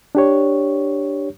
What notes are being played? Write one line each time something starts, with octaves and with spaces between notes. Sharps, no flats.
D4 G4 C#5